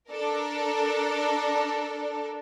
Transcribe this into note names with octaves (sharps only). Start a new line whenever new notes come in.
D4 A4 A#4 D5